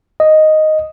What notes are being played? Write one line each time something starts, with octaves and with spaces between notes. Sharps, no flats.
D#5